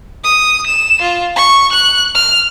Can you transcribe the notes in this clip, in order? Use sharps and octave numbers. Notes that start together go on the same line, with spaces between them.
D#6
E7
F4
C#6
F#6
F6